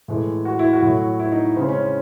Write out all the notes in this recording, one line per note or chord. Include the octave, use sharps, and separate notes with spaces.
A2 E3 G#3
F#4
E4
F#4
A2 F#3
E4
D#4
C#3 G#3 C4
C#4